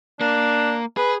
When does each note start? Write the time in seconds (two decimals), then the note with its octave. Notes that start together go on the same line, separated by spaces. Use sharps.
0.21 A#3 D4 A#4
0.97 G#4 B4